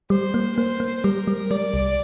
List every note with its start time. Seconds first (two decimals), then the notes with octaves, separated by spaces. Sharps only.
0.10 G3 C5
0.34 A#3
0.57 A#3 C5
0.80 A#3
1.04 G3 A#4
1.27 G3
1.50 G3 D5
1.74 C2